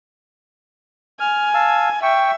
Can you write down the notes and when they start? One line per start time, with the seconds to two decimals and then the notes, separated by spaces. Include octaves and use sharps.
1.20 G#5 F6
1.54 F5 A5 E6
2.03 E5 G5 C#6